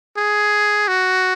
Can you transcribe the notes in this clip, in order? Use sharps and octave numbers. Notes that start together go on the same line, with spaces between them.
G#4
F#4